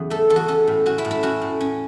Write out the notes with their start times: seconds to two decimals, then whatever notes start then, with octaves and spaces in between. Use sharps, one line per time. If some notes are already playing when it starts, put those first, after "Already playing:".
Already playing: E2 C#3 F#3
0.10 A3 A4
0.30 E2 A4
0.36 F#4
0.48 C#4 A4
0.67 A2
0.86 C#4 F#4
0.98 E4
1.05 A2
1.11 E4
1.23 C#4 F#4
1.41 A2
1.61 C#4